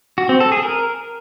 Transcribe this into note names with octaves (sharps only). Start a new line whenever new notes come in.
F#4
C4
A4
G#4
A#4